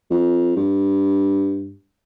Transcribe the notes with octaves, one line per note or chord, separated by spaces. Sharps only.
F2
G2